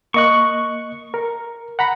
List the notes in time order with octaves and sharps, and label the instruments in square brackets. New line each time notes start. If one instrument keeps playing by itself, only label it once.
[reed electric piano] A#3 D#5 F#6 [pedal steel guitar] C#6
[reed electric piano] A#4
F#5 A#5 B5